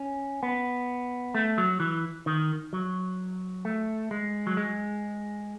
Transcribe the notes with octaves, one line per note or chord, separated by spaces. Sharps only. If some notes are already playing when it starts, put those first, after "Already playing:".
Already playing: C#4
B3
A3
F#3
E3
D#3
F#3
A3
G#3
F#3
G#3